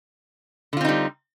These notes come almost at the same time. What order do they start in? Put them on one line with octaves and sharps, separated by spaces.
D3 F4 C4 D#4 G3